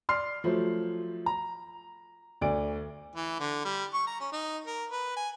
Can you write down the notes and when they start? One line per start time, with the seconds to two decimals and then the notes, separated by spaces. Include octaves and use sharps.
0.09 D5 C6 F6 C7
0.44 F3 F#3 A3 C5
1.26 A#5
2.41 D2 D5 D7
3.16 E3
3.40 D3
3.65 G3
3.93 C#6
4.07 A#5
4.20 C#4
4.32 D#4
4.66 A#4
4.91 B4
5.16 G#5